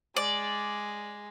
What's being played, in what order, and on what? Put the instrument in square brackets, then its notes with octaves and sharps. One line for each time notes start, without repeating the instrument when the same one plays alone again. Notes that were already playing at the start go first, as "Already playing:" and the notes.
[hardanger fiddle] G#3 [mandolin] D5